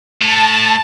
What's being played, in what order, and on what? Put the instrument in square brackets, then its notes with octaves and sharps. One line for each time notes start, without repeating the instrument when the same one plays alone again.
[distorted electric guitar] A2 [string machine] A5